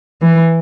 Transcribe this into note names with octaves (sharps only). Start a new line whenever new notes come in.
E3